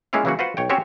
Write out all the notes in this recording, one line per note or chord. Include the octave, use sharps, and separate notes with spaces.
G#3 A#3 C#4 E4 F4 F5
C#3 E3 F#3 A#3 C#4 F#4
F4 F#4 B4 C5 F#5
B1 C#5 G5
C4 C#4 F#4 G4 C5 C#5